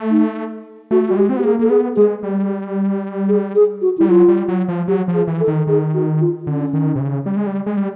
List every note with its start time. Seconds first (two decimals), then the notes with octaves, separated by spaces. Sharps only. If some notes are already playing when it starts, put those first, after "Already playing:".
Already playing: A3
0.11 D#4
0.91 A3 F#4
1.08 G3 F#4
1.17 G#3 G4
1.29 C4
1.37 B3 G4
1.44 A#3 G#4
1.59 A#3 A4
1.70 B3 G#4
1.96 G#3 G#4
2.23 G3
3.28 G#4
3.55 G#4
3.82 F#4
3.98 G3 E4
4.08 F#3 F4
4.28 G3
4.48 F#3
4.68 F3
4.88 F#3 G4
5.08 F3
5.14 G#4
5.27 E3
5.40 A4
5.48 D#3
5.67 D#3 G#4
5.94 F#4
6.21 F4
6.47 D3 C#4
6.73 D#3
6.96 C3
7.00 C#3
7.26 G3
7.37 G#3
7.47 G3
7.66 G#3
7.77 G3